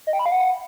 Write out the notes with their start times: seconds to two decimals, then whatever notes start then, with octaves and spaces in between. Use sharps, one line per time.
0.07 D#5
0.13 G5
0.19 B5
0.26 F5
0.32 F#5